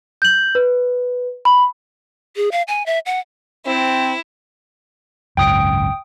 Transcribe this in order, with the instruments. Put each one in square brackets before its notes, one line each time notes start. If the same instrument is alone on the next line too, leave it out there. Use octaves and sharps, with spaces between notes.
[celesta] G6 F#7
B4
B5
[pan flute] G#4
F5
G#5
E5
F#5
[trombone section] C4 [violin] E4
[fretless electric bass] G#1 C#2 F#2 [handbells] G5 D#6 D7